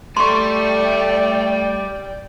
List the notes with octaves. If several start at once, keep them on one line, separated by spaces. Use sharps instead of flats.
G3 A3 D5 G5 C6 C#6